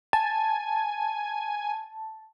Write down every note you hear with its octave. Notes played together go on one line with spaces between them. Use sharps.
G#5 A5